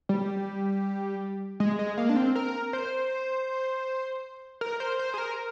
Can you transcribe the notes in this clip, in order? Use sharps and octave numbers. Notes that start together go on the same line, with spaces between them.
G3
G#3
G#3
A#3
D4
C4
A#4
C5
A#4
C5
C5
G#4
A#4